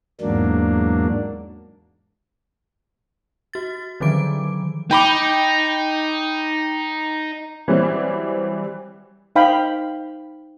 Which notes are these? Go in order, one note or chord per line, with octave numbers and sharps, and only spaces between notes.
E2 G#2 F#3 A#3 D4
F#4 A6
D3 D#3 F3 F#3 D6 D7
D#4 G5 B5 D6
E3 F#3 G3 C4
D#4 C5 F5 G5 B5